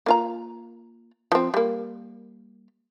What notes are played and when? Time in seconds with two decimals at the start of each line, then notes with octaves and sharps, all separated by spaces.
0.06 A#3 F4 A#5
1.32 F3 C4
1.54 G3 A#3